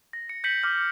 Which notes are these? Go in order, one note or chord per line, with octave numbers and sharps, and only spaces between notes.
A#6
C#7
G6 A#6 B6 C#7 F#7
D6 F6 G6 B6